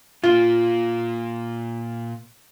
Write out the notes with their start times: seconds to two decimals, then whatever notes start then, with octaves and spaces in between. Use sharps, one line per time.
0.24 A#2 A#3 F4